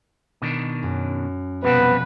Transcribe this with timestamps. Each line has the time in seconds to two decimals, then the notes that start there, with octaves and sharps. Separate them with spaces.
0.42 B2 D#3 D4
0.83 F#2
1.64 F1 B2 G3 B3 C4 B4